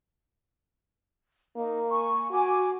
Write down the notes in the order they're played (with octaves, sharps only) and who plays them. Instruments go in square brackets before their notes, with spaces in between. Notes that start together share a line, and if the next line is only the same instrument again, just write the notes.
[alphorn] A#3 [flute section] D#4
[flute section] G#5 C#6
[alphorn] F#4 [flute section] G#5 D6